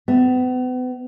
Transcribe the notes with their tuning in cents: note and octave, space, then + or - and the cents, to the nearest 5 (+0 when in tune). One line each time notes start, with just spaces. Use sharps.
B3 +40 E5 +0